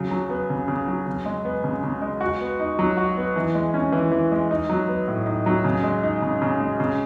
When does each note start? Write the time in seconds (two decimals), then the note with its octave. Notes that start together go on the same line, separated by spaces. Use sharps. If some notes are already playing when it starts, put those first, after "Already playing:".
Already playing: C#3 F#3
0.11 F#3
0.30 B3
0.50 C#3
0.68 C#3
0.88 F#3
1.07 C#3
1.26 G#3
1.45 B3
1.64 C#3
1.83 C#3
2.02 G#3
2.21 F#4
2.40 B3
2.60 D#4
2.79 F#3
2.97 F#4
3.17 B3
3.36 E3
3.55 G#3
3.74 C#4
3.92 E3
4.11 E3
4.32 G#3
4.51 D#4
4.69 F#3
4.88 B3
5.08 A2
5.26 D#4
5.46 F#3
5.64 C#3
5.84 G#3
6.03 D#4
6.22 C#3
6.42 C#3
6.60 G#3
6.80 C#3